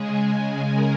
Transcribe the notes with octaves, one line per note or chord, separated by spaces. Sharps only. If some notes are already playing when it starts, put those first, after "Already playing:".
Already playing: C#3 G#3 G#4
A#4